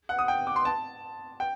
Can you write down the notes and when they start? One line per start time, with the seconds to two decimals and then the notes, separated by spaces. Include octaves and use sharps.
0.09 F#5
0.19 D#6
0.28 G5
0.47 D6
0.56 C6
0.65 A5
1.40 G5